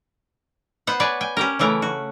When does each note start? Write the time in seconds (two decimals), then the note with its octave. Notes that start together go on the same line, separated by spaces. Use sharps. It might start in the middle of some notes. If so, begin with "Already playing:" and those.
0.87 B3 C5 F#5
1.00 B4 C#5 D5 G#5
1.21 G5 G#5
1.37 C#4 G4 A#4
1.59 C#3 E3 A3 A#4
1.82 F#4